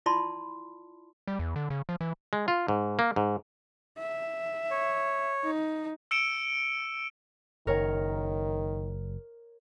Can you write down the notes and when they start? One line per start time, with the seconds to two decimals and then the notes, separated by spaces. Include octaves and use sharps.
0.06 E4 F4 D5 A5 B5 C6
1.28 G3
1.39 E2
1.56 D3
1.70 C#3
1.89 F3
2.01 E3
2.33 G#3
2.48 F4
2.68 G#2
2.99 A#3
3.16 G#2
3.98 E5
4.71 C#5
5.44 D#4
6.11 E6 C#7 D7 E7 G7
7.67 F#1 D#3 A#4 C#5